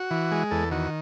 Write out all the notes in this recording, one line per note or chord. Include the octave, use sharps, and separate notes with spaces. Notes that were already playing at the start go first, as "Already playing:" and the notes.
Already playing: F#4
E3
G#3
E2 A4
D#3 F#4